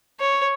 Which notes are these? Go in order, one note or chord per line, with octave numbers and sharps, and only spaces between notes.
C#5